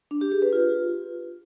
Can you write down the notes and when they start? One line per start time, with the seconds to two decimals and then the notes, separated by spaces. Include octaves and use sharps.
0.11 D4
0.21 G4
0.32 G#4
0.42 B4
0.53 F4